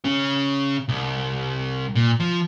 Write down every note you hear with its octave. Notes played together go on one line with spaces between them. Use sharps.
C#3 C#4
C2
A#2
F3